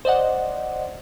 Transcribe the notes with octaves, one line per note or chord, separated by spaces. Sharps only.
C5 D5 D#5 F#5